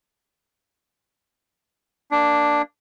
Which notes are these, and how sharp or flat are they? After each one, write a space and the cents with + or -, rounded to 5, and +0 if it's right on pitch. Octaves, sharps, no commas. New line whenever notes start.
A#3 -5 D4 +0